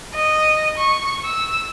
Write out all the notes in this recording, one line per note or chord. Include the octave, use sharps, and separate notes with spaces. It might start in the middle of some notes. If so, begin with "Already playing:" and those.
D#5
C#6
E6